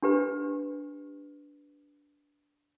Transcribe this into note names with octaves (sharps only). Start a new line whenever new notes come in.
D4 G4 B4